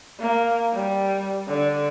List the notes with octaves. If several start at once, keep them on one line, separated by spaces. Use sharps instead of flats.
A#3
G3
D3